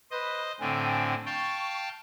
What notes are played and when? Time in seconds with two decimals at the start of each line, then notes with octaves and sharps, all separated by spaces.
0.11 B4 C5 D#5
0.60 A2 D3 C4 G5 G#5
1.26 F5 G5 A5 C#6